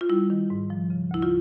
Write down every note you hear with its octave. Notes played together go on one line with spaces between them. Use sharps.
F4
G3 E4
D#3
G#2
F3
C#3
D2 E4
F4